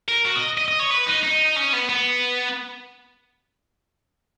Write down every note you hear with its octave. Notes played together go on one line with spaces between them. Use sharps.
A#4
F#4
D#5
D#5
D#5
C#5
B4
D#4
D#4
C#4
B3
B3